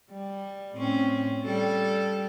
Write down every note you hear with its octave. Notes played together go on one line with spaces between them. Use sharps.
G3
A2 C4 C#4
G3 A4